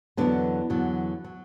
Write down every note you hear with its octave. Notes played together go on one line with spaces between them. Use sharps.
E2 D3 F#3 B3 D4
E2 D3 F#3
F#3